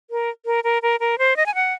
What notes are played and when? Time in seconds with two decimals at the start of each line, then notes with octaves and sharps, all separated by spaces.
0.10 A#4
0.46 A#4
0.64 A#4
0.82 A#4
1.00 A#4
1.18 C5
1.37 D#5
1.46 G#5
1.55 F#5